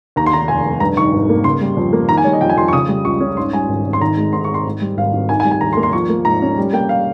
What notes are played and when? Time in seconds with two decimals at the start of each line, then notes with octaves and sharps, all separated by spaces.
0.16 D#2 A#5
0.26 C6
0.33 D#3 A#5
0.48 F1 G#5
0.65 F1
0.80 G2 A#5
0.97 D#3 C#6
1.12 G#1
1.29 A#3
1.44 C#3 C6
1.61 G3
1.77 F2
1.93 A#3
2.09 D#3 A#5
2.18 G#5
2.24 G3 C#5
2.33 D#5
2.41 F2 G5
2.50 G#5
2.57 F2 C6
2.68 C#6
2.73 C#3 D#6
2.88 G3
3.05 C#2 C#6
3.20 C#4
3.37 G#2 C6
3.53 G3 G#5
3.69 G#1
3.85 G#1
3.93 C6
4.01 D#3 A#5
4.17 G#3
4.33 G#2 C6
4.44 C#6
4.50 C4 C6
4.66 G#2
4.81 G3
4.97 G#1 F5
5.13 G#1
5.29 D#3 G#5
5.40 G#5
5.45 G3
5.51 G#5
5.61 D#2 A#5
5.73 C6
5.77 A#3
5.83 C6
5.93 F3 C#6
6.10 A#3
6.25 G#2 A#5
6.42 C#4
6.58 G3
6.73 A#3 G5
6.89 F5